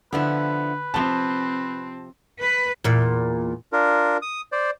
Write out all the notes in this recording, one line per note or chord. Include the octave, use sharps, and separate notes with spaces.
D3 F3 B3 E4 B4
C3 F3 C4 A5
B4
E2 A#2
D4 F4 A#4
D#6
C5 D5